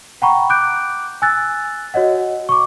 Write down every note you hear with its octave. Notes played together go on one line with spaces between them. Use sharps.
F#5 G5 A#5 B5 C#6
D6 F#6 G6 D7
G#5 E6 F#6 A6
F#4 C#5 D#5 F#5
C#6 D6